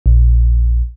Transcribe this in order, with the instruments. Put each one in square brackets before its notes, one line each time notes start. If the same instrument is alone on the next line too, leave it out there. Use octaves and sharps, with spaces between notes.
[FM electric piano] A#1